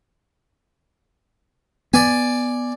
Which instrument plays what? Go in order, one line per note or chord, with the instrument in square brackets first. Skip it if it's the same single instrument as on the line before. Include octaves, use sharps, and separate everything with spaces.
[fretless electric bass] B3 [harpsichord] D5 G#5